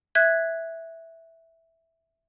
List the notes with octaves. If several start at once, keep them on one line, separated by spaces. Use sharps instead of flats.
E5 F#6 G#6